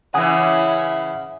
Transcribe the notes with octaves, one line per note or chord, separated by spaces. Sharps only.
C#3 E3 E4 C#5 F#5 G#5 D#6